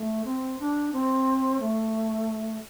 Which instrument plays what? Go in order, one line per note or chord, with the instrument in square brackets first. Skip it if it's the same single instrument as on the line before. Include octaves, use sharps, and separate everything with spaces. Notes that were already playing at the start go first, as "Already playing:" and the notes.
Already playing: [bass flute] A3
C4
D4
C4
A3